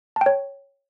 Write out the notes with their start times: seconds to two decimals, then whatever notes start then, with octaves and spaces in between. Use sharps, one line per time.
0.16 A5
0.21 G5
0.26 C#5